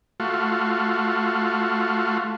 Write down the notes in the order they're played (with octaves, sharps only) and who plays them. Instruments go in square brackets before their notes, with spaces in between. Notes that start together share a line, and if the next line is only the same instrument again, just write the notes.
[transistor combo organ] A3 F4 F#4